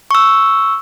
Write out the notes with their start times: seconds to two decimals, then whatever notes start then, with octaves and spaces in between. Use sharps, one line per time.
0.11 C#6 E6